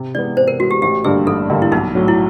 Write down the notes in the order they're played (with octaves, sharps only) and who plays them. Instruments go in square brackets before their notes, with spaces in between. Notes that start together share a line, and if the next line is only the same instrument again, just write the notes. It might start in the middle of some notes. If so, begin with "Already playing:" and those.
Already playing: [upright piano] C3
[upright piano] E3 G#3 B3 [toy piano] D5
[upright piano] C3 [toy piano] C5
[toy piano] A#4
[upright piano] E3 G#3 B3 [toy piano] F#4
[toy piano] G4
[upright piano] A1 [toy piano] G4
[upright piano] G2 D3 G3 A#3 [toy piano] G#4
[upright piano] A1 [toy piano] A4
[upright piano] G2 D3 G3 A#3
[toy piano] E4
[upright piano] B1 [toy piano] D#4
[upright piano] A2 F#3
[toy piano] E4